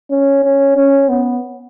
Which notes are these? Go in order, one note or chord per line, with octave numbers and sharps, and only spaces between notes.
C#4
C#4
C#4
B3